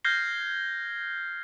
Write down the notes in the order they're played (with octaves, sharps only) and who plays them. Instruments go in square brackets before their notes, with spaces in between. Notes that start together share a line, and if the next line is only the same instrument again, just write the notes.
[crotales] F6 G6 G#6 A#6 C7 G7